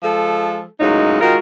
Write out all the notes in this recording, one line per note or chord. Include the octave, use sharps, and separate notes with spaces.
F3 G#3 A4
F#2 A2 C#3 G#3 D#4
D#3 G#3 F4 F#4 A#4